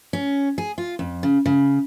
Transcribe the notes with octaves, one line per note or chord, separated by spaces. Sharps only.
C#4
G#4
F4
F2
C#3
C#3